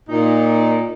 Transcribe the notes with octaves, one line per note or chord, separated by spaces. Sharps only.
A#2 D#4